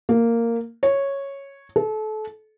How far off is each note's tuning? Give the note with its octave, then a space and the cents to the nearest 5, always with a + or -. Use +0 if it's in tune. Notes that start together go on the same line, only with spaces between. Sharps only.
A#3 -10
C#5 -5
A4 -30